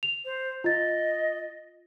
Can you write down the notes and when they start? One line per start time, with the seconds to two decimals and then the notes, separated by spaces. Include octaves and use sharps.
0.03 F7
0.25 C5
0.64 F4 D#5 A6